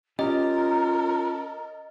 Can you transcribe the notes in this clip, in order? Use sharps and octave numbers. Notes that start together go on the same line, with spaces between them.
C#4 F4 G4 A#4 D#5